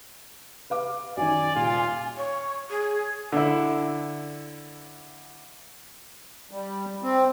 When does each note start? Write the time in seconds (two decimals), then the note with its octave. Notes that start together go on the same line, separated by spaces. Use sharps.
0.70 B4 F5 D6
1.17 F#2 D#3 D5 G#5
1.56 D#1 F4
2.17 C#5
2.70 G#4
3.32 D3 E4
6.51 G3
7.03 C4